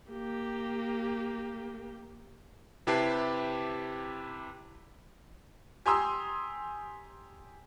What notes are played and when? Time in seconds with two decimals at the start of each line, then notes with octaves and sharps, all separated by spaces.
0.11 A#3 G4
2.87 C3 E4 G4 B4 A5 C7
5.86 G4 G#5 A#5 C6 D#6 E6